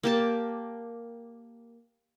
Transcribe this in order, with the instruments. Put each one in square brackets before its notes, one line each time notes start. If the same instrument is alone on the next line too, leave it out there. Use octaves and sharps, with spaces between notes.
[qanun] A#3 G4 A5